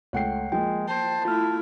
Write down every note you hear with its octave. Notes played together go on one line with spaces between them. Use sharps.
C#2 A3 C#5 F#5 G5 C7
F3 G#3 A#3 G5
C5 A5
A3 E4 F4 F6